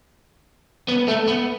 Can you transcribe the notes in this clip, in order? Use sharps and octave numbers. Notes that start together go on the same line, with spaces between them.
B3
A3
B3